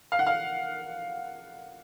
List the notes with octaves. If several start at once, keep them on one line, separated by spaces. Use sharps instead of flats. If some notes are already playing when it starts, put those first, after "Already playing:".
F5
F#5
F5